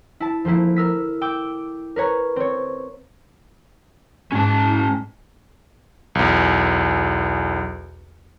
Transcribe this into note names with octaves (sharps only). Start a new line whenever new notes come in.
E4 A5
F3 A3 A#3 E4
A#4 E6 B6
G5 D6 E6
A#4 B4 C#5 A#5
C4 C#5
G#2 C#4 A5
B1 E2